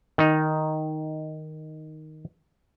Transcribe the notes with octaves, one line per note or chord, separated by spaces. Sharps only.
D#3 D#4